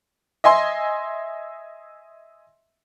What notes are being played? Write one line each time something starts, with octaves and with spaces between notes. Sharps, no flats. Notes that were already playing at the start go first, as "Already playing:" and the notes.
D#5 E5 G#5 C6